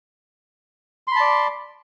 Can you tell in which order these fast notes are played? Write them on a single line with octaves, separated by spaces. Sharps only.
C6 B5 A5 D5